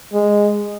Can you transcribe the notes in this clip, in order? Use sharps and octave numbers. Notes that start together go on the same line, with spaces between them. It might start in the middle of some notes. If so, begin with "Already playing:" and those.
G#3